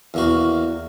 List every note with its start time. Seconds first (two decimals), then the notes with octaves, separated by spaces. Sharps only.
0.14 E2 A#3 F#4